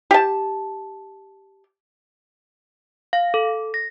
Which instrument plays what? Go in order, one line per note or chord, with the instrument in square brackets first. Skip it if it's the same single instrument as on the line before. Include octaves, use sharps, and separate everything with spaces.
[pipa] G4 A5
[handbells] F5
A4
A#6